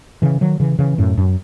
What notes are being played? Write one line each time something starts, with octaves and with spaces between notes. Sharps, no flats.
C#3 E3
D#3 F#3
C#3 E3
C#3 E3
F#2 A2
F#2